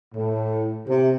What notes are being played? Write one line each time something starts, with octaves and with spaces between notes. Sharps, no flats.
A2
C3